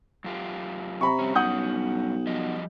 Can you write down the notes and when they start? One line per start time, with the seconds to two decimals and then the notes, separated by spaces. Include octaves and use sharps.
0.24 F#2 F4 G4
1.01 C3 A#5 B5 C#6
1.19 G2 C#4
1.35 B1 F#5 D#6 G6
2.27 F3 G3 D#5